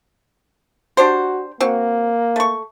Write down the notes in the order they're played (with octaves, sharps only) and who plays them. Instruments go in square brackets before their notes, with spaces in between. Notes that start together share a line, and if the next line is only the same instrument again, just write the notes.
[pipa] D4 G4 C5 [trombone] F#4
[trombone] A#3 [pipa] C4 F#4
[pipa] A3 C#6